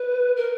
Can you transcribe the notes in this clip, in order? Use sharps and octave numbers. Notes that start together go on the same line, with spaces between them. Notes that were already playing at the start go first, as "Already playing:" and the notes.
Already playing: B4
A#4